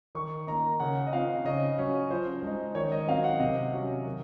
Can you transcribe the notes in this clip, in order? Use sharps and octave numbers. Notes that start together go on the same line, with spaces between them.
D#3 C#6
A#3 D#4 A#5
C#3 F#5
D#5
F3 C4 D#4 F5
C#3 D#5
F#3 C#4
F3 C5
G#3 D#4
D#3 C#5
D#5
F#3 C4 D#4 F5
F#5
C3 D#5
F#3 C#4
D#3